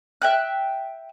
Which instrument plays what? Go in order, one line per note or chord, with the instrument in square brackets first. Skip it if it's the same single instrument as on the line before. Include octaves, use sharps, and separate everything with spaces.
[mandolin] E5 G5 F#6